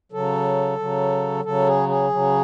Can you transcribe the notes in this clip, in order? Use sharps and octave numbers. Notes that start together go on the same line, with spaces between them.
C#3 F#3 A4
C#3 F#3
C#3 F#3 A4
G#4
G#4
C#3 F#3